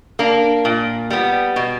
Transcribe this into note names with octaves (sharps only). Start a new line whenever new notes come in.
A#3 D4
A#2
G3 B3
B2